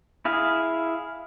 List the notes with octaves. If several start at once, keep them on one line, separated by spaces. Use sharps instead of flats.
E4 G#4 F5